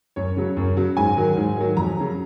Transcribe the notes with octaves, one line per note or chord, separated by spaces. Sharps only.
F#2 C#5
C#3 F#3
F#2
C#3 F#3
G#2 G#5
D#3 F#3
G#2
D#3 F#3
F2 A#5
C#3 F#3